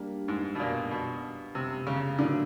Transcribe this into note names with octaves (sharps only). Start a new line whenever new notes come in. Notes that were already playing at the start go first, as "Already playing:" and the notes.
Already playing: G3 A#3 D4
G#2
B2
A#2
B2
C3
C#3
A2 D3 F#3 A#3